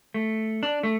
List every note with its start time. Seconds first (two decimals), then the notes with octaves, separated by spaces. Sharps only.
0.14 A3
0.63 D4
0.83 A3